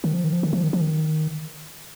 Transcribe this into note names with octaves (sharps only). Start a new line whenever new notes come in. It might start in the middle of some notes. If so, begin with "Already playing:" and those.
D#3
F3
D#3
F3
D#3
F3
D#3
F3
D#3